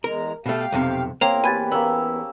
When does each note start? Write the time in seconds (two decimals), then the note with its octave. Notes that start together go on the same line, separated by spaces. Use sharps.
0.04 E2 G#3 A#4 A#5
0.46 B2 A3 G4 F5
0.72 B1 F2 C3
1.21 E2 A#3 C4 C#5 F5 A#5
1.44 G4 B4 G#5 G#6 A6
1.72 A#3 B3 C#4 E6